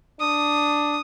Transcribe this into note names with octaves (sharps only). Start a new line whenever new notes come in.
D4 D#6